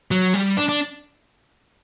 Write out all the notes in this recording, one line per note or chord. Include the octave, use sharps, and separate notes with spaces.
F#3
G3
D4
D4